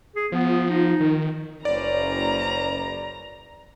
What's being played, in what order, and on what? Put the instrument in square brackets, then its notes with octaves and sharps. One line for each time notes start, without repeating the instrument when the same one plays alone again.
[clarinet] G#4
[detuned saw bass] F3 [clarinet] B3
[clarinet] D#4
[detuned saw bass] D#3
[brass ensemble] F#1 [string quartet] C#4 B4 C5 [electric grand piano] D5 [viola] A#5